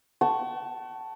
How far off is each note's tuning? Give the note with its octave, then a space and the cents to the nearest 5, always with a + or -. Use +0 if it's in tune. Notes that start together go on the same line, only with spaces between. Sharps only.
F#5 +45 A5 +0 C#6 +0